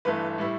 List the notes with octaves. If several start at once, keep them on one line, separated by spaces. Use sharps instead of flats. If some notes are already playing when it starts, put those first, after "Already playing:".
G1 G2 E3 A3 B4
A2 G3 E4